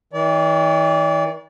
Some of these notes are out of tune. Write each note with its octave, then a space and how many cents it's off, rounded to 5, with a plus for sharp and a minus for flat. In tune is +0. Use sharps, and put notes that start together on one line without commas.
E3 -45 D5 -35